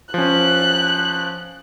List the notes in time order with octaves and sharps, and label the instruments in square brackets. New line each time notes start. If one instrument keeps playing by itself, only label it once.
[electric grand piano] F3 C#4 [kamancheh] F#6